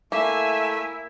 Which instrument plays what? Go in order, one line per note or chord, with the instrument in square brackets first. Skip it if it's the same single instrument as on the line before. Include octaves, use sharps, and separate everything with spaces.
[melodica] A3 [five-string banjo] A#3 [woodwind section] E4 [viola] E5 G#5